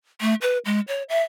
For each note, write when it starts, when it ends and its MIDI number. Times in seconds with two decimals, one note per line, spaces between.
0.21 0.34 57
0.42 0.58 71
0.65 0.80 56
0.88 1.03 73
1.09 1.21 76